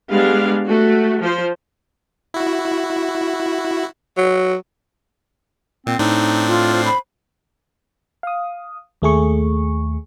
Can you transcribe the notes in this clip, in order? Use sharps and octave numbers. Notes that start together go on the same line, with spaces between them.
G3 G#3 B3 D4 F5
A3 F#4
F3 C5
E4 F#4
F#3
A#2 C4
A2 C4 D4 D#4
F4
C5
B5
F5 D#6
D#2 A3 G#4 C#6